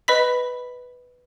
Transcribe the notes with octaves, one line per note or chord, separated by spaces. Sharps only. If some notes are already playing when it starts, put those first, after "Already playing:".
B4 D#5 B5 B6